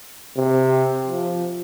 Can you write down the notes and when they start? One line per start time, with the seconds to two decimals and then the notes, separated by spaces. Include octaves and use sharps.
0.37 C3
1.07 F3